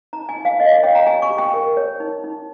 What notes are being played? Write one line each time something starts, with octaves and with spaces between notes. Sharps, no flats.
D#4 A#5
G#5
D#4
F5
A#4 D#5
F5
C#5 G5
A#5
G4 G#5
C#6
G4
G5
A#4
C#5
D#4
D#4